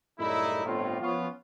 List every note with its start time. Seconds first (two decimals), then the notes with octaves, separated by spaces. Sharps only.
0.19 F#2 A2 C#3 G3 D#4 E4
0.65 G1 A2 C4 F4
1.01 F3 B3 C#4 F4